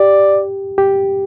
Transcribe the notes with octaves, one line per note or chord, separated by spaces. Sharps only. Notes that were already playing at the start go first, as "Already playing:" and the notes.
Already playing: G4 D5
G4